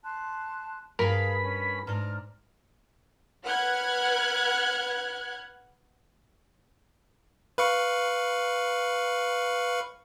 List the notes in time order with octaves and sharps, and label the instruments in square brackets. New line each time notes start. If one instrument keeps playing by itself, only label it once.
[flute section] A5 C6 F#6
[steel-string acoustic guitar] G2 B4 [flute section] G#4 F5 [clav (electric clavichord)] A#4 [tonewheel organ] B5
[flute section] C#4
[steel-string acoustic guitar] G#2 D4 [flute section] A#5 F6
[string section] B4 F#5 F6 F#6 G#6
[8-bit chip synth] B4 F5 C#6